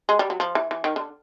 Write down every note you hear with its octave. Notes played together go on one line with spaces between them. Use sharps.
G#3
G3
F#3
F3
E3
E3
D#3
D3